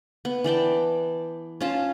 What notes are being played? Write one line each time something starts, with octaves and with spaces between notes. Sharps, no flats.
B3
E3 D5 G5 A5
C#4 F4 A5